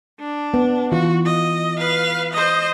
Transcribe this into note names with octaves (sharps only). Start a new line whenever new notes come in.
D4
B3
E3 F4 F#4
D#5
B4 F5
C5 D#5